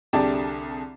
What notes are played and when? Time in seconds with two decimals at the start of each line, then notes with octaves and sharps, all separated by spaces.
0.13 C2 D3 G4 G#4 D5 A5